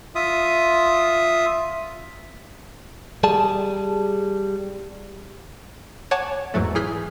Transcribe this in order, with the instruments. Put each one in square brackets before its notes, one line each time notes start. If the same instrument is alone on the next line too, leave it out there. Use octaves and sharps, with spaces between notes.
[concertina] F4 E5 D#6
[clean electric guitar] G3 G#4 A5
[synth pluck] C#5 F#5 G#5 A5 D6
E2 G#2 F#3 A3
E3 G#4 F6 G6 B6